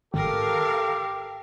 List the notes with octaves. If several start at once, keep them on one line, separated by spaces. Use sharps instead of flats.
G#1 G4 A4 A#4 F5